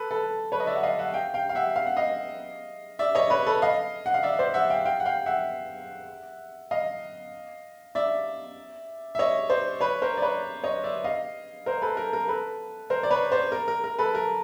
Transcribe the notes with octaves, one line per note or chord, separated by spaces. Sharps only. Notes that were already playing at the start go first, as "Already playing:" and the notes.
Already playing: A4 B4
A4 B4
B4 C#5
D#5
D5 E5
F#5
D#5 F5
E5 F#5
F5 G5
F5 G5
F5
E5 F#5
F5
F#5
D#5 F5
D5 E5
C#5 D#5
B4 C#5
A4 B4
D#5 F5
F#5
F5
D5 E5
C5 D5
E5 F#5
F5 G5
F5 G5
F#5
F5 G5
E5 F#5
D#5 F5
D5 E5
E5
C#5 D#5
C5 D5
B4 C#5
A#4 C5
D5
B4 C#5
C#5 D#5
D5 E5
D#5 F5
A#4 C5
A4 B4
A#4
A#4
A4 B4
A#4 C5
D5
B4 C#5
C5 D5
A#4
A#4
A#4
A4 B4
A#4